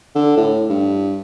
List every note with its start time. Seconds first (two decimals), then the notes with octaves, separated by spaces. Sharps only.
0.15 D3
0.37 A2
0.70 G2